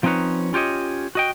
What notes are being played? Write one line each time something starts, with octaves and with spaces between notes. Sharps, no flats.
F3 C4 C#4 D#4 B4 C#5
C#4 F4 G4 C#5 D#5
F#4 D#5 G5